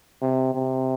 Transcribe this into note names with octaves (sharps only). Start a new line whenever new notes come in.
C3
C3